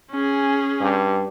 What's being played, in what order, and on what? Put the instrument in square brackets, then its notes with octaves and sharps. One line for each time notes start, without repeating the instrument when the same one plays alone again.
[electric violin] C#4 G#4
[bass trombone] G2